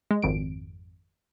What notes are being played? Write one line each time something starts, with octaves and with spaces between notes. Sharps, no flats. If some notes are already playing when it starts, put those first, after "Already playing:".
G#3
G#1 F2 D7